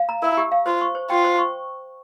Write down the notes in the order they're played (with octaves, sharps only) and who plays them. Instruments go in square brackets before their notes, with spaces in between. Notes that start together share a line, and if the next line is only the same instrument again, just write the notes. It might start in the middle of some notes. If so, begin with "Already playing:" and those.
Already playing: [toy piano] F5
A#5
[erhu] E4 [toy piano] A#4
[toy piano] G4
F5
[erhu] F4 [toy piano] C5
[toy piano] C#6
C5
[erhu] F4 [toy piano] G5
[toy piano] C5
C#6